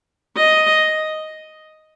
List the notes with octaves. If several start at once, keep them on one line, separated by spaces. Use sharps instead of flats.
D#5